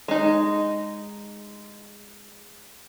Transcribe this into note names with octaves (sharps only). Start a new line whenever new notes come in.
G#3 D#4